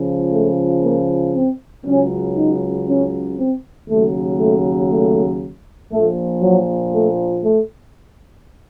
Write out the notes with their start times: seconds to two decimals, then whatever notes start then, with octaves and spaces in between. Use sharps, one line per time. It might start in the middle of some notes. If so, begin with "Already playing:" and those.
Already playing: C#2 C#3 F3
0.31 A3
0.83 A#3
1.34 C4
1.84 C#2 C#3 F#3 C#4
2.35 D#4
2.86 C#4
3.36 C4
3.88 D#2 C#3 F#3 A3
4.38 A3
4.89 A3
5.91 A#1 A#2 F3 A3
6.41 F#3
6.92 A3
7.44 A3